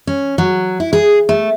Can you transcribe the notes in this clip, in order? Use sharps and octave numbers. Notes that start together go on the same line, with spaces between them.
C#4
F#3
E4
G#4
A3